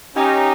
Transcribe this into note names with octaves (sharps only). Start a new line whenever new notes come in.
C#4 D#4 G4